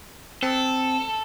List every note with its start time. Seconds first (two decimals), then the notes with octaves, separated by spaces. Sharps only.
0.43 C4 A4